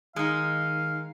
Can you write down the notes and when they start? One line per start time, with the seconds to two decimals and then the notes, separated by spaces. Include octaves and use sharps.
0.16 D#3 G#3 D#4 F5